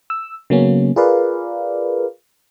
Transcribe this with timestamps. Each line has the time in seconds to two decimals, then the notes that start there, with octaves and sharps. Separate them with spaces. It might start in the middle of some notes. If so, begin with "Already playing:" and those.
0.10 E6
0.50 C#3 F#3 A#3 B3 C#4
0.96 F4 G#4 A#4 B4 D5 F5